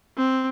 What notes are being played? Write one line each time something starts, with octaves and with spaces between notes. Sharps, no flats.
C4